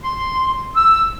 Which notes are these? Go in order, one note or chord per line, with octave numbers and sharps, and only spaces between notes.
C6
E6